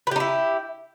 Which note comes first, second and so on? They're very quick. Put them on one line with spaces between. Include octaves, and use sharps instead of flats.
B4 G4 D#4 E4